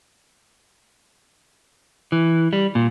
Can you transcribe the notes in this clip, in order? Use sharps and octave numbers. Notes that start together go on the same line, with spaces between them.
E3
G3
A#2